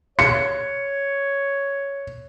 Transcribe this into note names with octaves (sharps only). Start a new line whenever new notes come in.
C#5 C#7